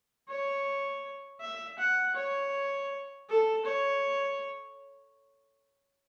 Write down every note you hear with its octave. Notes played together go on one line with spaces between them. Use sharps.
C#5
E5
F#5
C#5
A4
C#5